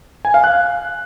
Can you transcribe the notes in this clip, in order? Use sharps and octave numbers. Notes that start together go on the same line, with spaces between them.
G#5
F5
F#6